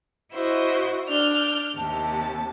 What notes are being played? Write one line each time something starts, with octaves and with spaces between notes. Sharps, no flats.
E4 F#4 C5 D#5
D4 F6 G6
D#2 C3 A5